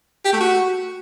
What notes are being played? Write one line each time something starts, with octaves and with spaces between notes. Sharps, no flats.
G4
A3
F#4